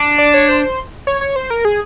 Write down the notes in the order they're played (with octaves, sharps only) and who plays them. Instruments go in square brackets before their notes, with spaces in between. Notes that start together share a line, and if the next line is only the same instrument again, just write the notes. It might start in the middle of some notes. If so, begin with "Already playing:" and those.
Already playing: [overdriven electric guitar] D4
[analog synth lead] D5
C#5
C5
C#5
C#5
C5
A#4
G#4